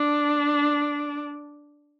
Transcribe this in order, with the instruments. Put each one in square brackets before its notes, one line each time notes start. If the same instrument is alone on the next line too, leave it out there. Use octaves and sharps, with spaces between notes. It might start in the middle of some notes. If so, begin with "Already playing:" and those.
Already playing: [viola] D4